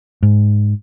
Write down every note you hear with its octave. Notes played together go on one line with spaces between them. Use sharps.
G#2